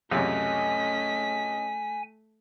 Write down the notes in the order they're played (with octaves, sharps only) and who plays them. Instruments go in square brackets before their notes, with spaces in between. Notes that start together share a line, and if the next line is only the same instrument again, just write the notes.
[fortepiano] C#2 F#2 C3 [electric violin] A3 B6 [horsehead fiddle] C#4 D#5 [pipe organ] G#5